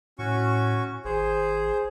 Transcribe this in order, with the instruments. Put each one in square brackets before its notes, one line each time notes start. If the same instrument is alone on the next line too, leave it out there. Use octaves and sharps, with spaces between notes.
[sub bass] A2 [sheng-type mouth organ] C#4 F#4 C#6
[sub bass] G#1 [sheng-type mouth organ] G#4 C5